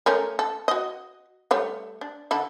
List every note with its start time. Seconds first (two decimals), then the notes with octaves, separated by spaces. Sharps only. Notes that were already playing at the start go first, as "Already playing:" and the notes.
0.06 A3 C#4 A#4
0.39 A4
0.68 F#4 D#5
1.51 G3 A3 C#5
2.01 D4
2.31 D3 A4 B5